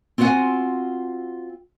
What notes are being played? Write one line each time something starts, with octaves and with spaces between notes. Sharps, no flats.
C4 F4 F#4 B4 F#5 G#5